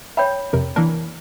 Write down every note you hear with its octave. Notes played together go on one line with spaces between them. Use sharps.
C#5 E5 G5 B5
F2 C3 A#4
E3 A#3 D4 A#4